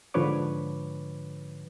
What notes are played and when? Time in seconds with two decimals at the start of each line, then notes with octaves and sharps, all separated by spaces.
0.14 G#2 D3 F3 B4 C#5 D6